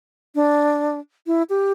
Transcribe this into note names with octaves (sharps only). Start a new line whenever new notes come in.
D4
E4
G4